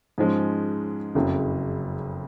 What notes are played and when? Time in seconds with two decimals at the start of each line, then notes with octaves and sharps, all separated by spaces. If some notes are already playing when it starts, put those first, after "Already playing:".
0.18 G#2 F3 G#3 C#4
1.15 F#1 F2 C#3 F#3